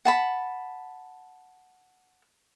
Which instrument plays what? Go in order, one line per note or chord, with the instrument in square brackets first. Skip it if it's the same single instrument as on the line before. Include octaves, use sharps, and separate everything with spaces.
[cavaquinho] F#5 A5 B5